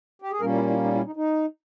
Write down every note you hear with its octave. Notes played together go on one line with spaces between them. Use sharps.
G4
G#4
A#2 G3 A#3 C#4 A#4
E4
E4
D#4
E4
D#4
D#4